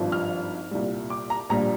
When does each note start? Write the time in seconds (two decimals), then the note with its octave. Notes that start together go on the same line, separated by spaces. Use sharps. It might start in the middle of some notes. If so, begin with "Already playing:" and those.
Already playing: G#1 G2 F3
0.12 F6
0.71 C2 A#2 G3
1.10 D6
1.30 A#5
1.49 A#1 A#2 G3 A#5